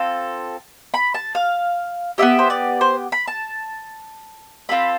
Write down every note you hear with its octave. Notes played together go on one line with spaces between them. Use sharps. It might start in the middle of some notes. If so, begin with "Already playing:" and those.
Already playing: C4 F4 A4
B5
A5
F5
B3 E4 G4 E5
C5
D5
C5
B5
A5
C4 F4 A4 B5